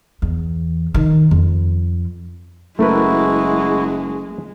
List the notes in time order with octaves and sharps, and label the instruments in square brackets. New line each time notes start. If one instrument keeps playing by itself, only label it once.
[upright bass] E2
D#3
F2
[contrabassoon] F#1 [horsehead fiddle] G#3 [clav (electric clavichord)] A3 A#4 B4 [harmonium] E4 F#4